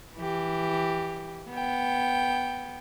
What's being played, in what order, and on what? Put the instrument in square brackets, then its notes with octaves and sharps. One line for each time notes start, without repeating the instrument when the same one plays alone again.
[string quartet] E3 G4
B3 G5